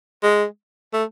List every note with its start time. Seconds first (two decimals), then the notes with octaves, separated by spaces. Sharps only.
0.23 G#3
0.93 A3